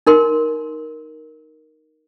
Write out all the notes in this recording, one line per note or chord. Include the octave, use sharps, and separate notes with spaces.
D#4 A#4 C6